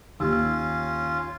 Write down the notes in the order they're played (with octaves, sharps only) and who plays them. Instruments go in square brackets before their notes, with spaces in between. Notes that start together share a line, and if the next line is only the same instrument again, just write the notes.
[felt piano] D#2 G4 E6 [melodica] C#4 F4